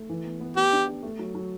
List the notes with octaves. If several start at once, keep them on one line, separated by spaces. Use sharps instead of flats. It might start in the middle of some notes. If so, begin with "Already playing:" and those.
Already playing: A3
E3
B3
B3
B3 G4
D4
G4
A3
F#3
F#3